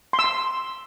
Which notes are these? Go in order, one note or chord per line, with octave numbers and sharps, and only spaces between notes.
C6
E6
C6